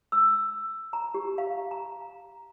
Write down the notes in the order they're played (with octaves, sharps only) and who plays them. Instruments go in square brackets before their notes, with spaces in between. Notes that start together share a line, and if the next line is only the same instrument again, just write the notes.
[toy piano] E6
A#5
G4
F5
A#5